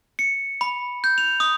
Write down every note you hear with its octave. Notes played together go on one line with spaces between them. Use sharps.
C#7
B5
G6
F7
D#6